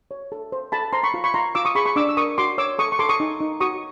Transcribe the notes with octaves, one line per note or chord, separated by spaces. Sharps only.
C#5
A4
C5
A4 A5 B5
C5 A#5 C6
B5 C#6
F4
B5 C#6
F4 A#5 C6
F4 D6 E6
C#6 D#6
G#4 B5 C#6
B5 C#6
D4 D6 E6
E6
A#4 C#6 D#6
F#4 C6 D6
C#5 D6 E6
A4 C#6 D#6
C#6
A4 C6 D6
C#6 D#6
D#4
D#4
F#4 C#6 D#6